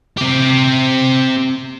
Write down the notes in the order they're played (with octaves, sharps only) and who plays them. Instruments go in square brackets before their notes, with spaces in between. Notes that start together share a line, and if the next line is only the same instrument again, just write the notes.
[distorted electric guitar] C4 G4